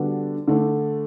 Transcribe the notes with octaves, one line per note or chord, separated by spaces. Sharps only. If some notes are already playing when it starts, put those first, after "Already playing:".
Already playing: D3 G3 B3 D4 F#4
D3 A3 D4